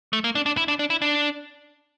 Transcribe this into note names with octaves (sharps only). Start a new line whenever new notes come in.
A3
A#3
D4
D4
E4
D4
D4
E4
D4